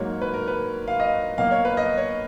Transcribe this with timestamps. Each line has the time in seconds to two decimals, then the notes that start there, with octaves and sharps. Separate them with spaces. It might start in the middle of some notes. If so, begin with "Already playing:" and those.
Already playing: G#2 F#3 A#3 C#5
0.22 B4
0.34 A#4
0.48 B4
0.88 F5
1.00 D#5
1.38 B2 F#3 A#3 F5
1.51 C#5
1.65 B4
1.77 D#5
1.97 C#5